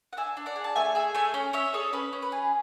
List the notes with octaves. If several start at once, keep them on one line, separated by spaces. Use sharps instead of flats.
F#5
D4 E5 G#5
D4
D5 F#5
G#4
A5
A3 E5 G#5
G#4 E5 G#5
A3 E5 G#5
C#4
C#4 C#5 E5
G#4 A4 C#5
C#4 B4
C#4
B4
G#4